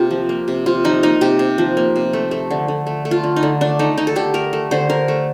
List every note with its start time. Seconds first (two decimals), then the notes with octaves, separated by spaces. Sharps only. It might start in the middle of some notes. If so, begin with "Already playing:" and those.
Already playing: C3 A#3 F4 G4
0.11 F3
0.29 A#3
0.48 C3
0.66 C3 F4
0.84 F3 D#4
1.03 A#3 D#4
1.21 C3 G4
1.39 C3
1.58 F3
1.77 A#3
1.96 C3
2.13 A3
2.31 A3
2.51 D3
2.68 D3
2.87 A3
3.05 A3
3.11 F4
3.23 D3
3.36 D#4
3.43 D3
3.61 A3 D4
3.79 A3 D#4
3.98 D3 D#4
4.07 A4
4.16 D3 G4
4.34 A3 A#4
4.53 A3
4.71 D3 C5
4.90 D3 A#4
5.08 A3